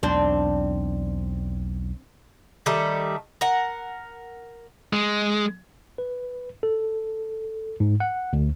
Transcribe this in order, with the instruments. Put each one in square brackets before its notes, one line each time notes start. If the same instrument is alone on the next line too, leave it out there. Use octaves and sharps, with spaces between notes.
[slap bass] B1 E2 [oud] C4 D4
[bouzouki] D#3 G3 A3 A4
A#4 F#5
[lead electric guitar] G#3
[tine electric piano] B4
A4
G#2
F#5
D2